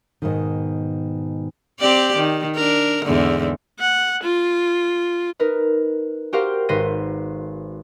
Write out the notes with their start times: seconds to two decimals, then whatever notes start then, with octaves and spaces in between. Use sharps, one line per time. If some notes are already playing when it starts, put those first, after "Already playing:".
0.22 G#2 B2 D#3
1.80 C4 G4 D5
2.17 D#3
2.56 D4 A#4
3.05 E2 G#2 D3
3.79 F#5
4.23 F4
5.39 D#4 A#4 B4
6.33 F#4 G4 A#4 C5 F5 G5
6.69 G#1 B4 C5 A#6 D#7